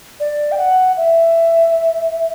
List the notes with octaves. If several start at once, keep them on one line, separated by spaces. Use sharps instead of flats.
D5
G5
F#5
E5